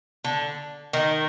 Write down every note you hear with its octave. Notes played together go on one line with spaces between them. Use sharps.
D3
D#3